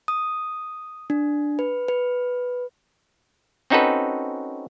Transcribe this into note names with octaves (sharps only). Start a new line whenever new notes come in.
D#6
D4
B4
B4
C4 C#4 D#4 F#4 A4 B4